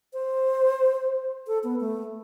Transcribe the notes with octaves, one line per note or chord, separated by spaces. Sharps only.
C5
A4
B3
A3